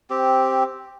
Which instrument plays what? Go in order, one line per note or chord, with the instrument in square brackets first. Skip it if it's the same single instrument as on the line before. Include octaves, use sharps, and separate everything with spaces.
[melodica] C4 G4